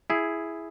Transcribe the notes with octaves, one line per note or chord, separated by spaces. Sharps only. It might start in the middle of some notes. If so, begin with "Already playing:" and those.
E4 G#4